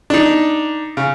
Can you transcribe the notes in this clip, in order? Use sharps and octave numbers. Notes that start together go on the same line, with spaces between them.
D4 D#4
C#3